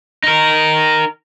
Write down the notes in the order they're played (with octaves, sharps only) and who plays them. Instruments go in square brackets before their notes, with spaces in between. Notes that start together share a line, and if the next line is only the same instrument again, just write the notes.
[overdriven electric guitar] D#4 A#4